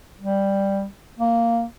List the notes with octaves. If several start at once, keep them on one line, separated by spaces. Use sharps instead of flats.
G3
A#3